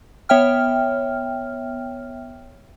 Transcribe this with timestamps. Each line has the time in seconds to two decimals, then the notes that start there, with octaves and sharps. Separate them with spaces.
0.29 B3 C#5 E5 G5 F6